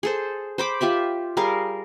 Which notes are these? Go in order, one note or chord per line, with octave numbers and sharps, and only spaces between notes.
G#4 A4 C5
C5 B5 D6
F4 G4 E5 B5
G3 G#4 A#4 F5